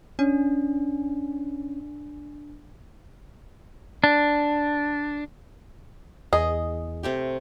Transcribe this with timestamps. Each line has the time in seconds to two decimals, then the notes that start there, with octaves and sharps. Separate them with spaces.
0.19 C#4 D4
4.04 D4
6.33 E2 G#4 D#5
7.03 C3 A3 G4